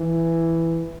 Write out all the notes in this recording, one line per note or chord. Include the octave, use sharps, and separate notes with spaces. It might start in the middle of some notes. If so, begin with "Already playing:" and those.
Already playing: E3